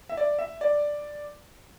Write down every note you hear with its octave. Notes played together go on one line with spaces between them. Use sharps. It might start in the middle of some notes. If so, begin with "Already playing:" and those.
E5
D5
E5
D5